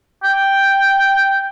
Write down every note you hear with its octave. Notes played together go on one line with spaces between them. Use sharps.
G5